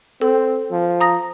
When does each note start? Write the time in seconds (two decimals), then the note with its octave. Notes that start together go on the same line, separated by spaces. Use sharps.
0.21 C4 A4
0.71 F3
1.01 A#5 D#6 A#6